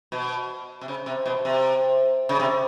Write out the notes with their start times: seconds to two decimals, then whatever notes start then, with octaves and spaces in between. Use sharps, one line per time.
0.12 B2
0.81 C3
0.88 C#3
1.06 C3
1.26 B2
1.45 C3
2.29 C#3
2.40 C3